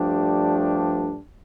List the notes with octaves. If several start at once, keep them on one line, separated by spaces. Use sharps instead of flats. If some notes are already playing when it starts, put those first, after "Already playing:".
Already playing: G2 F3 A3 D4 G4